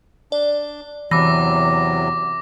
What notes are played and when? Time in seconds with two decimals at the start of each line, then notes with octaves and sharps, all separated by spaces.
0.32 D4 D5
1.11 E2 C3 E3 F#3 D6 A#6